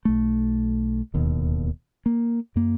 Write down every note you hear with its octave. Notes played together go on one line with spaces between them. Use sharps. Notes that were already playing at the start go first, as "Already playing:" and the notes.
B1 A3
D1 D#2 B2
A#3
F#2 A#3